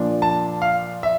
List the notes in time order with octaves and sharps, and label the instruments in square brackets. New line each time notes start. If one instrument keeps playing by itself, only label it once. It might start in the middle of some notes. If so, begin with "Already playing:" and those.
Already playing: [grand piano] A#2 F3 A#3 D4
A5
F5
E5